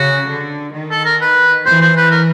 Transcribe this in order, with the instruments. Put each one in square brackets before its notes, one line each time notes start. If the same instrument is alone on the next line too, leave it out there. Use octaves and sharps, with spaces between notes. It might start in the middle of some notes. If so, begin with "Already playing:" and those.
Already playing: [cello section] C#3 [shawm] F#4
[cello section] D3
D#3
[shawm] A4
A#4
B4
[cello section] E3 [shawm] C5
[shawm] C5
B4
A#4